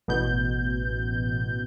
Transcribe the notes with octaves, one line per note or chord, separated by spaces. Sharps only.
A1 B2 G6